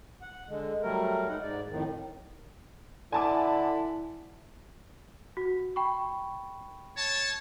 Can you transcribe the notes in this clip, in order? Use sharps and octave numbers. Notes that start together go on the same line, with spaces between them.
F#5
D3 G#3
F#3 G3 A3 A#4
G#3 D#4 F#5
G#2 D5
F2 A2 D#3
D3 E4 G#5 A5 D6
F#4
G5 B5 C#6
C#5 A5